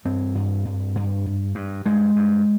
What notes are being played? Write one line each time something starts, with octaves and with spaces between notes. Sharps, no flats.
G2 C4
G2
G2
G2
G2
G2
G2 G#3
G2